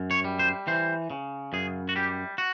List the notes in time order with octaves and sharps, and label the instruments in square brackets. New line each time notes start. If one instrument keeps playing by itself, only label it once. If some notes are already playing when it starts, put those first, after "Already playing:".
Already playing: [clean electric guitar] F#2
C#5
G3
C5
E3 C5
C#3
F#2 G#4
F#4
G3 G4
F#4